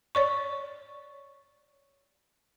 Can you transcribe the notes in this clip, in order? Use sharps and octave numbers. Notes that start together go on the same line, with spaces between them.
C#5 D5 C#6